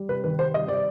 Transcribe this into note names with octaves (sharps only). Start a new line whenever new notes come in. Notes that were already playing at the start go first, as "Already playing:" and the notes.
Already playing: G3
C3 B4
D#3 B4
C3 C5
G3 D#5
G3 D5